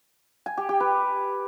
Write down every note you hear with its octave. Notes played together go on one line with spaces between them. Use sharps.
G#5
G4
G4
B4